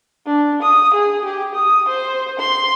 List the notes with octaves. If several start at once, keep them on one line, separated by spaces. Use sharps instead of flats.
D4
D#6
G#4
G4
D#6
C5
C6